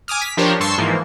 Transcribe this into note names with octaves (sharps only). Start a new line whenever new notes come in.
G#5 D6 D#6 F6
B6
F3 D4 G4 A#4 C5 C#5
G2 A5 C6 C#6 E6 C7
G#2 E3 F3 A#3